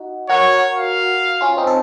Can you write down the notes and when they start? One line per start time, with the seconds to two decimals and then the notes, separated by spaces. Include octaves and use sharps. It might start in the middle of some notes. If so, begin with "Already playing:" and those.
Already playing: D#4 F#4
0.29 F#4 A#4 C#5
0.77 F5
1.41 C#4 F4
1.57 C4 D#4
1.67 A4